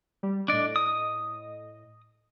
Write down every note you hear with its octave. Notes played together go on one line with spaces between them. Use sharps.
G3
A2 D4 D5 D#5
D#6